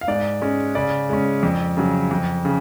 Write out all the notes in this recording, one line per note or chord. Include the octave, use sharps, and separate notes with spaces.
F5
G#2 D5
G#3 C#4
C#3 D5
G#3 C#4
F2
C#3 F#3
F2
C#3